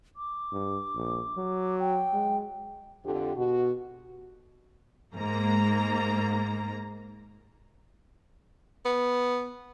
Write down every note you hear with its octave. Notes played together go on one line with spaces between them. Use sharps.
D6
G2
A#1
F#3
G5
G#3
F2 D3 G4
B2 F#4
G#2 A#3 A#5
B3